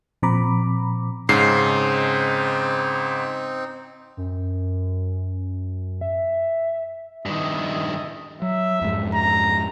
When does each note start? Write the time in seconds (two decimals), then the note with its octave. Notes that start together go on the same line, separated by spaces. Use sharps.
0.22 A#2 F3 C4 A#5 B5 D6
1.29 G#2 C#3 C4 D#4 C7
4.17 F#2
6.01 E5
7.25 G2 D#3 E4 A4 D#5
8.42 F#3 E5
8.81 F2 G#2
9.14 A#5